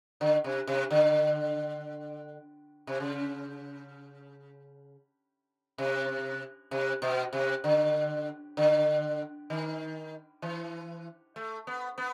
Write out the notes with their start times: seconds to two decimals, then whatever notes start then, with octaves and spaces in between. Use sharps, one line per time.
0.21 D3
0.44 C3
0.67 C3
0.91 D3
2.87 C3
3.00 C#3
5.78 C3
6.71 C3
7.02 B2
7.33 C3
7.64 D3
8.57 D3
9.50 D#3
10.42 E3
11.36 A3
11.67 B3
11.98 B3